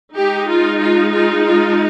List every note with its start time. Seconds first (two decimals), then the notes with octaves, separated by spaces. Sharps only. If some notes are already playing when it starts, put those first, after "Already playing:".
0.16 G#3 D#4 G4
0.49 F4
0.81 F4
1.13 F4
1.46 F4